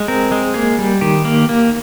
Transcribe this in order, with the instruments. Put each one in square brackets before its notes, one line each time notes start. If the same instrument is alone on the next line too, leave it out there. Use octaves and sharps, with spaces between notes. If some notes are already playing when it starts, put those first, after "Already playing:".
Already playing: [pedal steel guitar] G#3
C4 A#4
G#3
A#3 G#4
G3
D#3 G4
A#3
A#3